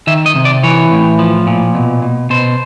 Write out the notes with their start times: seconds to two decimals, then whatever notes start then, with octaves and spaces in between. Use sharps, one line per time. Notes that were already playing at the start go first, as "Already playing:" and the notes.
0.07 D#3 E5
0.26 D#5
0.36 C3
0.45 D5
0.63 E3 C#5
0.91 A2
1.19 F3
1.47 A#2
1.75 B2
2.02 B2
2.30 B2 C5